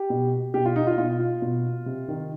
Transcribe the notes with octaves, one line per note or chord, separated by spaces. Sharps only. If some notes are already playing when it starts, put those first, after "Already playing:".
Already playing: G4
B2
B2 G4
F4
D#4
F4
B2 F4
B2
C3
D#3